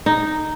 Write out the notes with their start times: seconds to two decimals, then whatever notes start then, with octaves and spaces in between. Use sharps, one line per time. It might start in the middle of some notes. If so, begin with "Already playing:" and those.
0.06 D#4